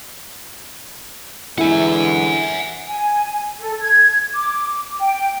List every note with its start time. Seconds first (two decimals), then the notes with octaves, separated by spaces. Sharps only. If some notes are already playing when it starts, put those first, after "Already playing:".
1.58 D3 E3 G#3 E4 F#5 G#5
2.88 G#5
3.59 A4
3.81 G#6
4.34 D6
5.00 G5